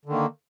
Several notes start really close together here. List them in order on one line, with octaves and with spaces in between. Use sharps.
D3 D#3 A#3